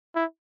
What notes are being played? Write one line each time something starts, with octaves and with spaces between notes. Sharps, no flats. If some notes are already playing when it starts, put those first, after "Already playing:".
E4